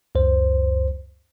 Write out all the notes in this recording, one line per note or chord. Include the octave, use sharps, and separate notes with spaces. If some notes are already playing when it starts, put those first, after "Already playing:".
C#2 F#2 C5